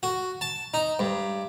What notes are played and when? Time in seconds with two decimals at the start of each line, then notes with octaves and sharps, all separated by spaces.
0.03 F#4
0.41 A5
0.74 D#4
0.99 G2